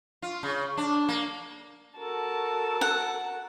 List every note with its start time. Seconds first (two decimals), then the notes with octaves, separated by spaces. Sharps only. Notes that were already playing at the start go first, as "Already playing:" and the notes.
0.22 F4
0.43 C#3
0.77 D4
1.09 A#3
1.99 F#4 A4 A#4 A5
2.81 F#5